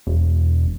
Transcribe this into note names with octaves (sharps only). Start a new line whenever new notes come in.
E1